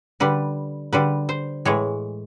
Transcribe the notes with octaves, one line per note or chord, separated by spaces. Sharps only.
D3 G3 B4
D3 G3 B4
C5
A2 E3 G#3 C#5